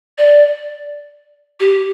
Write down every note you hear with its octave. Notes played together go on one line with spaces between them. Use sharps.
D5
G4